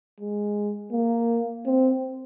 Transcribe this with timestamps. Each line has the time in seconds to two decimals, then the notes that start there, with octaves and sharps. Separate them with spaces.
0.20 G#3
0.92 A#3
1.66 C4